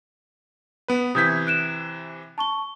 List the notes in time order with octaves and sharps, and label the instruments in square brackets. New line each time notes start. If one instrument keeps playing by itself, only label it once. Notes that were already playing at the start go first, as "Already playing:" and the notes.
[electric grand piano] B3 B4
[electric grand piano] C3 E3 B6 [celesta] D#6 G6 G#6
[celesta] F#6 D7 E7
A5 C#6 G7